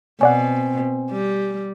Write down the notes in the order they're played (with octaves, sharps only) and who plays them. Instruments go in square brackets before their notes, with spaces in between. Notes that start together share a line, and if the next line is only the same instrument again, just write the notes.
[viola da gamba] B2 [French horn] C4 [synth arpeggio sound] C#5 D5 F#5 [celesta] G#5
[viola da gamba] G3